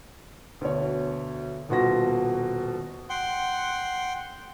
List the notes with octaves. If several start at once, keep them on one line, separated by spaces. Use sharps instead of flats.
D2 B2 C#5
D#1 B2 F4 F#4 A#6
F#5 G5 C6